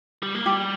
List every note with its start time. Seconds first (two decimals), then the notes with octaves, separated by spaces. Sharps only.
0.23 G3
0.35 A#3
0.46 G3 G4